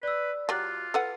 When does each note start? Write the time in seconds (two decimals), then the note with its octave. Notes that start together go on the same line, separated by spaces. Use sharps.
0.03 B4 D5 E6
0.49 F#3 F4 G4 D5 D6 F#6
0.94 A4 B4 F#5